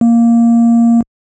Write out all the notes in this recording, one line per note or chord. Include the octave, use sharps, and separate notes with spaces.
A#3